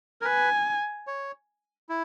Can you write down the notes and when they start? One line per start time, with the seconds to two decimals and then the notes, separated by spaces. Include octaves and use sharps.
0.21 A#4
0.25 B4 G#5
1.07 C#5
1.89 E4